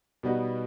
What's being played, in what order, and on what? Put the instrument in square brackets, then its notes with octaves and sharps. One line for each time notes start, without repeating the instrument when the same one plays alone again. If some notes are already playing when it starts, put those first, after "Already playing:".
[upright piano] B2 G3 B3 D#4 F#4